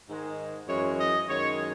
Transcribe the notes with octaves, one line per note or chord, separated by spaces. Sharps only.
G#2 D#3 G#3
F#2 E3 G#3 C#5
D#5
F#2 D#3 G#3 C#5